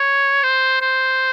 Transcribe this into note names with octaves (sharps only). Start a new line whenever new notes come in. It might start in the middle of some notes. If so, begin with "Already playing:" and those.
Already playing: C#5
C5
C5